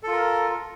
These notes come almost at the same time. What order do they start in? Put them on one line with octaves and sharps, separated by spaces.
A4 F4 A#4